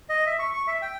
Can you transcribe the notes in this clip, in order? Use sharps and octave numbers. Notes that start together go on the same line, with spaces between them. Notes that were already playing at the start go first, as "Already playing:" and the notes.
D#5
E5
C#6
C#6
E5
G5